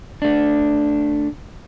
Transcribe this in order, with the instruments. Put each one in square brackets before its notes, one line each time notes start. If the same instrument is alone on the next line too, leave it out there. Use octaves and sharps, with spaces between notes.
[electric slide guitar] A3 D4